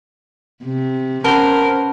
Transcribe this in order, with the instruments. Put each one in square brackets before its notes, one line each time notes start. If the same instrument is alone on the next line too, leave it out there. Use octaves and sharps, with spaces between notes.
[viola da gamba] C3
[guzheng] B3 C5 [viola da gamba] C#4 [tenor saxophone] A#4 [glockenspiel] A5 B5 G7